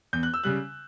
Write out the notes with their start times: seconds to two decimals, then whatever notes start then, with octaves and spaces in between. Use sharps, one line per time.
0.13 E2 G6
0.23 F#6
0.34 E6
0.44 C#3 G3 F#6